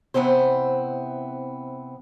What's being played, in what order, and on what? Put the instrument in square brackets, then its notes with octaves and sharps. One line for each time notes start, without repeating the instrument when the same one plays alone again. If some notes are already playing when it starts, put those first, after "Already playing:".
[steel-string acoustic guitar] C3 E3 B3 C4 C5